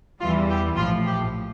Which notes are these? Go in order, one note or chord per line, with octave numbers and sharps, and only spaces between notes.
E2 E3 G3 F4
G4
A#1 A2 F3 F4
G4